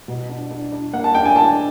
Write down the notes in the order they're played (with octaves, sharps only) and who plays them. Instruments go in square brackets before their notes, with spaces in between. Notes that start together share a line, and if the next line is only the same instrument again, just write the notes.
[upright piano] B2
D4
D4
D4
A#3 F#5
A5
D4 G5
G#5
D4 A5